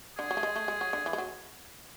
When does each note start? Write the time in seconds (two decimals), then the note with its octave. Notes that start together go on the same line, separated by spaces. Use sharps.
0.18 D3 G#4
0.31 F#3
0.37 A3
0.43 G#3
0.56 A3
0.68 G#3
0.81 F#3
0.93 D3
1.06 E3
1.13 G#3
1.18 F#3